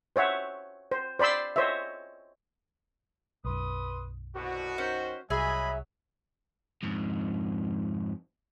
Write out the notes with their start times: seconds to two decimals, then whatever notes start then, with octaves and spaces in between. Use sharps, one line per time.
0.16 C5 C#5 E5 F#5
0.91 C5
1.19 C5 D5 B5 C6 E6
1.56 C5 C#5 D#5 E5
3.45 B1 F#2 B4 C6 D#6
4.36 C2 B2 F#4
4.78 D#3 C#4 C5
5.30 C2 F#3 G#4 D#5 E5 G#5 B5
6.83 F2 G#2